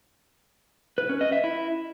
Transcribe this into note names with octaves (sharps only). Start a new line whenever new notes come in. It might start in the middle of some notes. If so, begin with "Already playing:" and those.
B4
C#4
D#5
E5
E4